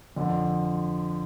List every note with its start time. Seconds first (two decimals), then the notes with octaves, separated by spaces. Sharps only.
0.16 F2 D3 F3